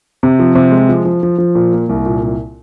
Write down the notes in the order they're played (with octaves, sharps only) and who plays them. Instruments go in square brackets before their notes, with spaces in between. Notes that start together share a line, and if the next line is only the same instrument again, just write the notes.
[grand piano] C3
F3
C3
G#3
F3
F3
F3
F3
A#2
A#3
C2
A#2
C2